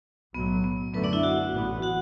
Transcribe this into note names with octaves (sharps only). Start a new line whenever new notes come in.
B1 A2 F#3 B3
B3
F#2 D3 F#3 A3 B3 B4
D4 D5
E4 E5
F#4 F#5
A1 A2 E3 B3
F#4 F#5